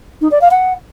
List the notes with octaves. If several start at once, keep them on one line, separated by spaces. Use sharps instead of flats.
D#4
D5
F5
F#5